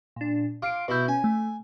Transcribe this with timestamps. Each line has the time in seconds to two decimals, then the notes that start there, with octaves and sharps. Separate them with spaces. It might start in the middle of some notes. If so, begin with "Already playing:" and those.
0.16 A#2 D4
0.62 F4 D6 C7 D7
0.88 B2 E4 B4 G6
1.08 C#4 G#5
1.24 A3